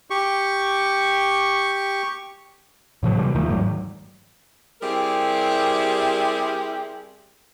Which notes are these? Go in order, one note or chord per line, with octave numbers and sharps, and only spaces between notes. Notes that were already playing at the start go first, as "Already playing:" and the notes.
G4 C#6
A2 C#3 F3 F#3
C3 E3 F#3 G3
D#2 D#3 F3 A3
G#2 D#3 F#3 G3
G3 C4 E4 G4 G#4 A#4